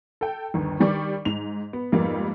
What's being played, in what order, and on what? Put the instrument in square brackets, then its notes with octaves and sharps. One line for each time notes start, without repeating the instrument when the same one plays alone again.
[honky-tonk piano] A4 G5
G1 D#2
D#3 G3 D5 C#6 D6
G#2 F7
B3
F2 G#2 G3 A#3 B3